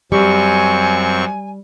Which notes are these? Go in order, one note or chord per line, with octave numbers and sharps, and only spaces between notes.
F#2 G3 C4 G#5 C#6